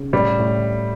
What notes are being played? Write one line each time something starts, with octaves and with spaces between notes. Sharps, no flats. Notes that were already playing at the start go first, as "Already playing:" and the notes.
Already playing: C#3
A2 G3
A2